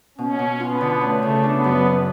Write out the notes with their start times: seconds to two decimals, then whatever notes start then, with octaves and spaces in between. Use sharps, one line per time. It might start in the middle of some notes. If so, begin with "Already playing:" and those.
0.18 B2 C#4
0.39 B2
0.60 B3 F4
0.81 D3
1.01 A3 C#4
1.23 C#3
1.43 B3 D4
1.64 F#2
1.85 C#4